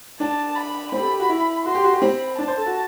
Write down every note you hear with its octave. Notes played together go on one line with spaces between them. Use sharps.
D4 A5
B5
C4 B5
G4
A4
G4
F#4
E4
F#4 C6
G4
F#4
G4
C4 B5
D4 A5
C5
A4
F#4